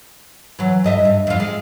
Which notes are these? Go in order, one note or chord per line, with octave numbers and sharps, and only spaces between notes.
E3 F#3
G2 D#5 E5
G2
F2 F4
G#3